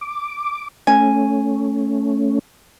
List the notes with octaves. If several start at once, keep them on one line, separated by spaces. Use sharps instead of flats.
D6
A3 C#4 G#5